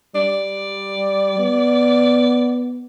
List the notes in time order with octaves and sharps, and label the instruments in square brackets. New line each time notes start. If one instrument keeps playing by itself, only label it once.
[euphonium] G3 [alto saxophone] D5
[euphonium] B3